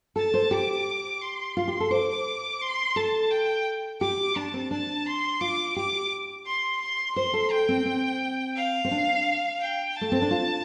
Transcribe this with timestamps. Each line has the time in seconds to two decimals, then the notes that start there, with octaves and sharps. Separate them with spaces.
0.16 A4 A5
0.34 C5
0.51 G4 D6
1.21 C6
1.57 F4
1.68 G4
1.80 A4
1.91 C5 D6
2.61 C6
2.96 A4 A5
3.31 G5
4.01 G4 D6
4.36 D4 A5
4.54 C4
4.71 D4 A5
5.06 C6
5.41 F4 D6
5.76 G4 D6
6.46 C6
6.81 C6
7.16 C5 C6
7.33 A4
7.51 G5
7.69 C4
7.86 C4
8.56 F5
8.85 C4
8.91 D4
9.61 G5
9.96 A5
10.01 A3
10.12 C4
10.22 D4
10.31 F4